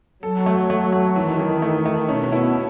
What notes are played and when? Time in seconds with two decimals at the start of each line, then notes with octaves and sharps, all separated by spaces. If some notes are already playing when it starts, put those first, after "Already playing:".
0.23 F#3 A4
0.46 A3
0.70 A3
0.92 A3
1.15 D#3 E3
1.39 E3
1.62 A3
1.85 A3
2.08 B2 C#4
2.32 E4